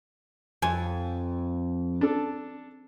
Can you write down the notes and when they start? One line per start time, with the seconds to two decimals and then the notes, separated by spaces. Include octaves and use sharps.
0.62 F2 G#5
2.01 D4 A4